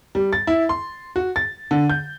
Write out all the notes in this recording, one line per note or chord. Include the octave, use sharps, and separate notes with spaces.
G3
A6
E4
C6
F#4
A6
D3
G6